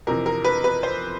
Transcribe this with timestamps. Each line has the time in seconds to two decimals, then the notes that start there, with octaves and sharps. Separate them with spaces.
0.07 F2 C3 E3 A#4
0.26 A#4
0.45 B4
0.64 B4
0.83 C5